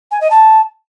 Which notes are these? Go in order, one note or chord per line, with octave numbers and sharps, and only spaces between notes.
G#5
D#5
A5